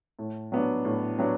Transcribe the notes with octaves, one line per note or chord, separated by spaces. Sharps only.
A2
F#3 B3 D4
A2
F#3 B3 D4